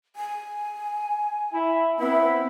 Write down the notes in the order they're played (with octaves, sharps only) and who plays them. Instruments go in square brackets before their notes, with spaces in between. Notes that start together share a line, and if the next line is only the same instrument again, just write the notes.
[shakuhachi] G#5
[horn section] E4
[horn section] B3 E4 [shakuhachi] C4